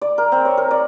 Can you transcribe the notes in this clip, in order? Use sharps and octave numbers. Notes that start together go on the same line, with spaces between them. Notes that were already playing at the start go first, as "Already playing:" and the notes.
D5
A#4
C4
C#5
A#4
D5